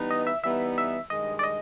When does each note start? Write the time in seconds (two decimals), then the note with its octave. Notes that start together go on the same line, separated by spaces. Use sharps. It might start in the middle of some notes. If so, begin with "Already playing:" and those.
Already playing: E3 G3 B3 D#4
0.11 D#5
0.27 E5
0.44 E3 G3 B3 D#4 E5
0.78 E5
1.10 G2 D#3 G#3 D#5
1.39 D5
1.43 D#5